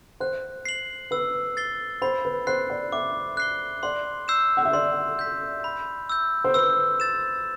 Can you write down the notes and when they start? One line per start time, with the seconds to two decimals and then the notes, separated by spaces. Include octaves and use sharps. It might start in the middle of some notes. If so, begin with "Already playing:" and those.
0.20 C5 F#6
0.65 C7 F#7
1.11 B4 E6
1.57 A6 C7 G7
2.02 C5 B5
2.25 B4
2.47 C5 F#6 C7
2.70 D5
2.92 E5 D6
3.37 F#6 C7 G7
3.83 D5 C6
4.28 E6 G6 C7 E7
4.57 F#5
4.65 E5
4.73 D5 C6
5.19 G6 B6
5.64 B5
6.09 E6 G6
6.44 C5
6.54 B4 E6
7.00 A6 E7